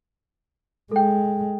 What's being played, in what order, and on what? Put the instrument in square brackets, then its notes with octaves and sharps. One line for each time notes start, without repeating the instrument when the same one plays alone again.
[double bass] G#3 [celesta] A4 G5